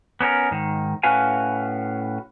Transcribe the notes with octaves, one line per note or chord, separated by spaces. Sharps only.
B3 C#4 D4 A#4
G#2 D#3
A2 C#4 F#4 B4 F5 G#5